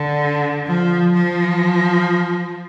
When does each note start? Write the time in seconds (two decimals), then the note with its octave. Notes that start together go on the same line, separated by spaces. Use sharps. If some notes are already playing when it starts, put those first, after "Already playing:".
Already playing: D3
0.66 F3
1.13 F3